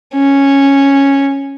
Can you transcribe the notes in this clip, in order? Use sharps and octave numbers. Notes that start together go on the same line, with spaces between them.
C#4